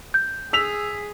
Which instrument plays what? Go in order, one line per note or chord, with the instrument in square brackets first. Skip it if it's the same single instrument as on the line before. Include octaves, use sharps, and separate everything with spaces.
[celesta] G6
[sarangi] G#4 [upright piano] E6 B6 F7